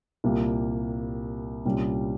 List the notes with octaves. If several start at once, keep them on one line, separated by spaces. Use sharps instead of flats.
C2 A#2 G3 A#3
C2 A#2 G3 C#4